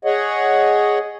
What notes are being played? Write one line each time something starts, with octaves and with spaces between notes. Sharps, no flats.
G#4 C#5 D#5 F#5